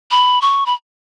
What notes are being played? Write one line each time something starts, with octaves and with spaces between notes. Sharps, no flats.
B5
C#6
B5